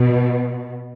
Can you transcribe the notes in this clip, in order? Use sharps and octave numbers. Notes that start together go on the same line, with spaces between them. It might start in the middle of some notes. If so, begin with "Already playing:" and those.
Already playing: B2